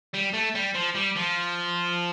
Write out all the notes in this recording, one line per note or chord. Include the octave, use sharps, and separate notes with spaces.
G3
A3
G3
F3
G3
F3